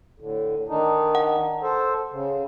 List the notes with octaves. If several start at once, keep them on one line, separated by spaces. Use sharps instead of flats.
A2 D3
D#3 D4 D#4
F#5
A4 C5
C#3